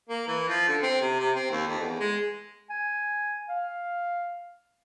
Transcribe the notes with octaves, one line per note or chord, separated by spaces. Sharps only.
A#3
E3
F3
D3
C4
C3
C3
C4
D#2
F2
E2
G#3
G#5
F5